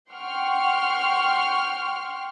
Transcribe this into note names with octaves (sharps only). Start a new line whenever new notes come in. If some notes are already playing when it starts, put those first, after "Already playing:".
F#5 G5 C6 C#6 F6